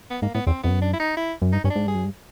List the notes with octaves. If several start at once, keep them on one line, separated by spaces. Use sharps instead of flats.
B3
G#2 A#3
A2 B3
E2 C4
F2 B3
F#2
D4
E4
D#4
E4
F#2
G2 D#4
G2 C#4
D4
G#2
G2 G#4
F#2
G2